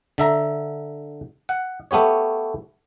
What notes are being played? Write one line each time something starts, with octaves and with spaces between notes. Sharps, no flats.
D3 E5 A#5
F#5
A3 B3 G4 C#5